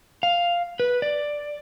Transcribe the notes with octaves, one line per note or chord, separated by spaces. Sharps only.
F5
B4
D5